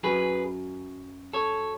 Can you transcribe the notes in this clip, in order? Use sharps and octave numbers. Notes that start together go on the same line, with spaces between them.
F#2 C#3 F#3 G#4 B4
A4 C#5